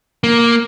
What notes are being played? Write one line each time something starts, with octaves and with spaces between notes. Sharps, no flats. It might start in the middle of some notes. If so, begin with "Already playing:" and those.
A#3